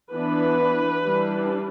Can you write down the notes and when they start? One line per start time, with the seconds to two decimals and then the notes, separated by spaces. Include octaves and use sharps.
0.13 E3 B3 D4 B4
1.03 E3 G3 D4